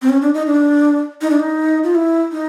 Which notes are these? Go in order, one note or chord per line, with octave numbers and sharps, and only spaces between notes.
C4
C#4
D4
D#4
D4
D#4
D4
D#4
F4
E4
D#4